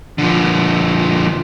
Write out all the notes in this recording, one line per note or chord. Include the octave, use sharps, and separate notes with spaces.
D3 F3